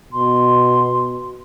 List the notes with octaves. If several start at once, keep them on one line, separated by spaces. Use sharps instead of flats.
B2 C6